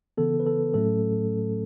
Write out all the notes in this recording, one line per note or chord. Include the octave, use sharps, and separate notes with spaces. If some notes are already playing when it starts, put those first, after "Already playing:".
C#3 E3 B3 A4
B4
A4
A2 F#3 A3 C#4 A4